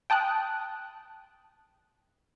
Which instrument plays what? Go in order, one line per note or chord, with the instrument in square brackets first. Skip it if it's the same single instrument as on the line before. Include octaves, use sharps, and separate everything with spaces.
[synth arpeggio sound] G5 A5 D#6 F#6